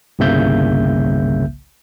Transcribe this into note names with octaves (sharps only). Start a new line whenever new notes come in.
G1 C2 C#3 A#3 E5 G6